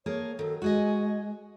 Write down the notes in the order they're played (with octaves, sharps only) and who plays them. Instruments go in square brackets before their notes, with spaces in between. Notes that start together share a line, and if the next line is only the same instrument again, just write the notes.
[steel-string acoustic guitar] A#3 G#4 A4 [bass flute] C#5
[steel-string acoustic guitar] D#3 F#3 [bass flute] A4
[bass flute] G#3 [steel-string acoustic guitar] F#4 G#4 D#5